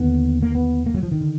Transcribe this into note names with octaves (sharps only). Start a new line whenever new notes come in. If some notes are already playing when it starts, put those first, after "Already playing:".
Already playing: D#2 D3 B3
A#3
B3
A#3
F#3
F3
D#3
D3